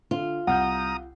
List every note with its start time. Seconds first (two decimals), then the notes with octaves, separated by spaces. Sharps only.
0.11 D3 F4
0.47 C2 F#5 A#5 D#6 F6 G6